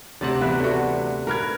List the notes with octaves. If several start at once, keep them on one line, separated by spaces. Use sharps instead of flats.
D2 C3 D5 F#5
E2 B3 B4 E5
D3 F#4
A#4 B4 B5 F6 G#6